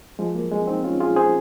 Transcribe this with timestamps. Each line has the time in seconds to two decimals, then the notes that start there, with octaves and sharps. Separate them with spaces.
0.19 F3 G#3
0.35 F#3 A#3
0.51 G#3 C4
0.67 C4 D#4
0.84 C#4 F4
1.00 F4 G#4
1.16 G#4 C5